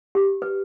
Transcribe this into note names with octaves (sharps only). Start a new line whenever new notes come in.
G4
B4